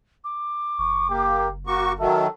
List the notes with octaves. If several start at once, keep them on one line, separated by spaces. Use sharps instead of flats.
D6
F#1 C#6
A#3 G4
A#3 F#4 C#6 D6
D#3 F#3 A4 E5